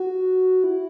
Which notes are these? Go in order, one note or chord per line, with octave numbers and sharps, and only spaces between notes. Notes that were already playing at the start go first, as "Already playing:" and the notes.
Already playing: F#4
E4